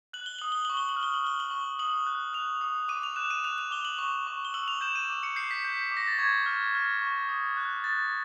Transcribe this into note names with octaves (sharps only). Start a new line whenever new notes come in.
F#6 F#7
G7
D#6 F#7
G7
C#6 F#7
G7
F#7
F6
G7
F#7
F6 G7
F#7
C#6
D#6 F#7
F#6
F#6 F7
D#6
D6 D#7
F7
F#6 E7
D#7
F#6 F7
F7
D6 G7
F#7
C#6 F#7
C#6
G7
E6 F#7
F7
G6 E7
D#7
D6
C#7
G6 C7
B6
G6
D6
A#6
A6
C#6 G#6
F6
F6
C#6
D#6
F#6
F#6 A6